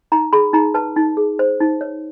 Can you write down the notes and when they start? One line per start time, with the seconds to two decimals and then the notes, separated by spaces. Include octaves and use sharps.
0.12 D#4 A#5
0.33 G#4 B5
0.53 D#4 A#5
0.74 B4 A5
0.96 D#4
1.17 G#4
1.39 C5
1.60 D#4
1.81 C#5